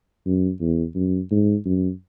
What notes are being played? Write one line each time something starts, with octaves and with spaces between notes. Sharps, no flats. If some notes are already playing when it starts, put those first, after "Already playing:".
F#2
E2
F#2
G#2
F#2